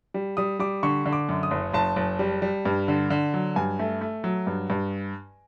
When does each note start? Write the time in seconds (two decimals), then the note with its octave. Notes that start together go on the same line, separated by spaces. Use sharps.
0.14 G3
0.37 G3 D#6
0.59 G3 D6
0.83 D3 C#6
1.06 D3
1.13 D6
1.29 F#2
1.43 D#6
1.51 F#1
1.73 F#1 A5
1.96 F#1
2.19 G3
2.42 G3
2.65 G2
2.88 D3
3.10 D3
3.34 F#3
3.56 G2 G#5
3.79 A3
4.01 A3
4.24 F#3
4.47 G2
4.70 G2